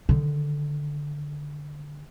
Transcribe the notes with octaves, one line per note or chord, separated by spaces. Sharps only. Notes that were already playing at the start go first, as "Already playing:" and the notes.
D3 D#3